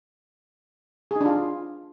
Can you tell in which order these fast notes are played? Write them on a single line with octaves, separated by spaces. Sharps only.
G#4 D#4 D4 F4